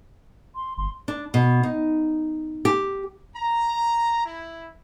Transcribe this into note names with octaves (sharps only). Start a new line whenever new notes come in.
C6
G1 C6
D4
B2
D#4
G4
A#5
E4